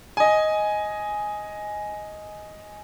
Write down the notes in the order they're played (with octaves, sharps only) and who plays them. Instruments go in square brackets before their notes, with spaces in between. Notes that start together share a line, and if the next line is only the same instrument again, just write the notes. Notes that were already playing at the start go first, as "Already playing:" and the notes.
[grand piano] D#5 G#5